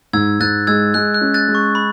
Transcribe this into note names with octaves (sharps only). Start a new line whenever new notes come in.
G#2 E6 G#6
G#2 F#6 A6
G#3 E6 G#6
G#3 F#6
F#6
C#4
F#6 A6
G#3
C#6
B5